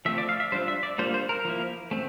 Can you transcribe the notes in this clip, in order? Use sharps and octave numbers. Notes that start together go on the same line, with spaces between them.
F3 A3 C4 F4 E5
D5
F5
E5
G3 D4 F4 C5
E5
D5
G3 A#3 D4 F4 C5
C5
A#4
F3 A#3 E4
A3 C4